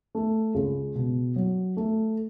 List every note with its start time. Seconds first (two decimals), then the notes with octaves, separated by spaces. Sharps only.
0.15 A3
0.54 C#2
0.95 B2
1.36 F#3
1.77 A3